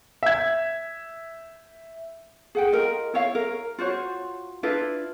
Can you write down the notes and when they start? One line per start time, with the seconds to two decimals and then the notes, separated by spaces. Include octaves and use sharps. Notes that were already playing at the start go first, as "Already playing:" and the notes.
0.23 E5 G#6
2.55 G#4 F#5 G5
2.72 F4 A#4 D#5
3.14 E4 C#5 F5
3.35 A#4
3.79 F4 F#4 C5 C#5
4.63 D4 E4 F4 B4